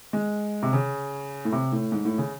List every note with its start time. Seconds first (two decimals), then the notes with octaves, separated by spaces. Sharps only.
0.13 G#3
0.63 C3
0.73 C#3
1.45 A2
1.53 C3
1.72 A2
1.92 G#2
2.05 A2
2.18 C#3